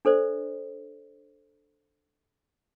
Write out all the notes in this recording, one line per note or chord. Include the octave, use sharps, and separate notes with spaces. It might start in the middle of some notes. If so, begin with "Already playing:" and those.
D4 A4 C5 D5